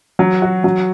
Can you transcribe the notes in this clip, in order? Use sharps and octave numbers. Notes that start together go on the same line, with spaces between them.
F#3
F#4
F#3